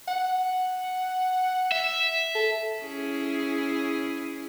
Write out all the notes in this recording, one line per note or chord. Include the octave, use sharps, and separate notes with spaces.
F#5
E5
A4
C#4 E4 G#4